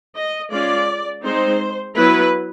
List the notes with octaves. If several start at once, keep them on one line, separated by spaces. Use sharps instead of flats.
D#5
G#3 C#4 F4 D5
G#3 C4 D#4 C5
F#3 B3 E4 B4